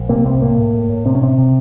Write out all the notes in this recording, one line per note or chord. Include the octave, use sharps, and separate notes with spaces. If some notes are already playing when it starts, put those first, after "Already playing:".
Already playing: A#1
C3 A#3
C2 C4
A2 A#3
A2
A2
A2
C3 C4
C#4
C3 C4
C3